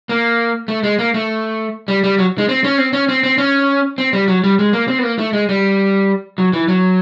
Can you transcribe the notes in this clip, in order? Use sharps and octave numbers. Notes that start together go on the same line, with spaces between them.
A#3
A3
G#3
A#3
A3
G3
G3
F#3
G#3
C4
C#4
C4
C#4
C4
C4
C#4
C4
G3
F#3
G3
G#3
A#3
C4
B3
A#3
A3
G#3
G3
F#3
E3
F#3